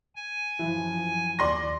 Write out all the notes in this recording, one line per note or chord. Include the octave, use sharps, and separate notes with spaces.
G#5
F#2 E3 F3
D#2 D5 C6 A#6